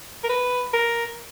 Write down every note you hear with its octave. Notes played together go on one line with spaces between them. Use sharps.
A#4
B4
A#4